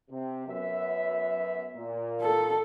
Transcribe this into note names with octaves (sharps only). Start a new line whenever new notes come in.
C3
F#2 B3 E5
A#2
A4